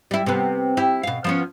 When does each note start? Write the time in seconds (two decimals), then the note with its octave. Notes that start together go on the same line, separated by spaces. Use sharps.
0.11 G3 E4
0.26 C3 B3
0.77 E4 G4
1.03 B2 F5
1.24 F3 B3 C#4